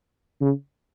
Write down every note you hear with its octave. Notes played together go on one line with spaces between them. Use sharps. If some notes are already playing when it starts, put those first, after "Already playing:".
C#3